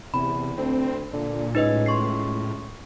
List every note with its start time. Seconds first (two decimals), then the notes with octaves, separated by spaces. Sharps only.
0.14 E2 C3 B5
0.58 D2 C4
1.13 A#2 D3
1.55 C#2 A2 D#4 B4 D#5
1.86 C6 C#6 C7